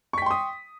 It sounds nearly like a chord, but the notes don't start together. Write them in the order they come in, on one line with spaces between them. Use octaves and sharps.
C#6 B6 G5 C6 D#6